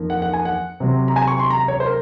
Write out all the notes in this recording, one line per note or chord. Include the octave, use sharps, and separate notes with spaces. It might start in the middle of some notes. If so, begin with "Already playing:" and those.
Already playing: F2 D#3 A#3
F#5
F#5
G#5
F#5
C3 F#3 C4
A#5
G#5
C#6
C6
A#5
C#5
C5
A#4